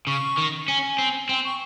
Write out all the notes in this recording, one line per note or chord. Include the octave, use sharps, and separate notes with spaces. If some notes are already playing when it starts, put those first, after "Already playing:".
C#3 C#6
D#3
C#4 G#5
C4
C4 G5
C#6